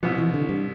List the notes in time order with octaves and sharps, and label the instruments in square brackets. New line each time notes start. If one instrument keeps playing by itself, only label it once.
[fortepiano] C2 B2 B3 [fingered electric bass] F3
[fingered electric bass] E3
D3
G2